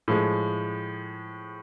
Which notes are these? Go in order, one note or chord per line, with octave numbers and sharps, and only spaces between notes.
A2 F3 G#3